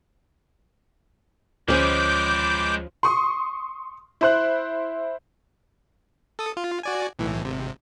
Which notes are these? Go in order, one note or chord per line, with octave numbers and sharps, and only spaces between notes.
D2 F3 G#3 C#4 G#4 B4 D6 G6
C6 C#6 D#6
E4 C5 F#6
A4 D#6
F4
F#4 D5 G#5
B1 A2 E3
G#1 C3